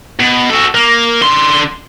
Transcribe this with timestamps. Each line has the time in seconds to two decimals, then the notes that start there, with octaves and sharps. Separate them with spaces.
0.20 B2
0.50 F#4 A4
0.75 A#3
1.22 D3 C6